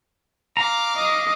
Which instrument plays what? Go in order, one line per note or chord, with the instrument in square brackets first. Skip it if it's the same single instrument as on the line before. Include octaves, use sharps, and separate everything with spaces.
[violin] F5 D6 [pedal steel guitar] A#5
[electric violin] D#5